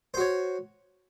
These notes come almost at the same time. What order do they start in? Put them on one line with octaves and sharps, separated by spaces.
C5 F#4 C#5